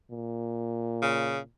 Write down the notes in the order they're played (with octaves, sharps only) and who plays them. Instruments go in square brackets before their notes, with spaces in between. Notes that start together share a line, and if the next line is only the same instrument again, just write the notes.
[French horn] A#2
[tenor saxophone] C#3